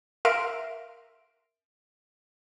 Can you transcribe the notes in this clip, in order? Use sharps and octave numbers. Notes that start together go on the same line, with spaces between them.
A#4 E5 F5 C6 D7